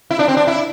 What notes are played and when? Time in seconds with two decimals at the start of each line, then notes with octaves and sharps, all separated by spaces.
0.10 E4
0.19 D4
0.28 C4
0.37 D4
0.47 E4